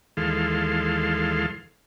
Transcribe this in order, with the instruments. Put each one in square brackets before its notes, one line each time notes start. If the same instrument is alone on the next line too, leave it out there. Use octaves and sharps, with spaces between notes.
[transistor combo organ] D#2 E3 G#3 A4 F5 C6